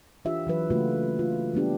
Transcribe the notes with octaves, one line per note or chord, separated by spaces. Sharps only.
E3 D4 F4 G4 E5
E3 F#3 B4
C#3 A3 A#3 F4 F#4 B4
F4
G3 B3 D4 G4